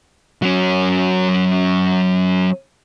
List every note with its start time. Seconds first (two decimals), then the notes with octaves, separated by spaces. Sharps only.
0.42 F#3 C#4